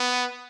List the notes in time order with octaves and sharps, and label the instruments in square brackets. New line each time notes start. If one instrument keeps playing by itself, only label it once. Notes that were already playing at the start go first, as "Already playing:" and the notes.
Already playing: [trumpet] B3